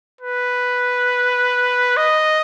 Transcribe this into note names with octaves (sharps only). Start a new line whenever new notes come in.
B4
D#5